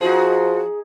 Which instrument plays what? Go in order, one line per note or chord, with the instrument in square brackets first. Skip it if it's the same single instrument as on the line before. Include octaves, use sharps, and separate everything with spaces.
[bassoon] F3 [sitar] D#4 G#4 [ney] F#4